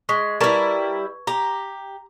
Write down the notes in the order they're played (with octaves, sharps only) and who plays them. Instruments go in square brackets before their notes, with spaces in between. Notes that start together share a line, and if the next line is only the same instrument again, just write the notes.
[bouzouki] G#3 [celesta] C#6 D#6 B6
[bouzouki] G3 E4 [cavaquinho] A#4 D5 A5 [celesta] B4 C#6 G#6
[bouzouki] G4 [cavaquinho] A#5